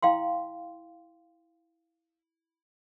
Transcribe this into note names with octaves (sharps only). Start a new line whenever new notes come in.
E4 F5 G5 C6